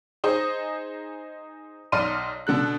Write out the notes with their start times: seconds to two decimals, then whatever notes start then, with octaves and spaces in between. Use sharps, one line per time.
0.24 D#4 G#4 C5 D#5
1.92 B1 D#4 D5 C6 F6 D#7
2.47 B2 D3 A4 F#6